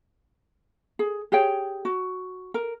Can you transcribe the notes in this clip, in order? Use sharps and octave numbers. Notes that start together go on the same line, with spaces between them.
G#4
G4 G#4 C#5 G5
F#4
A#4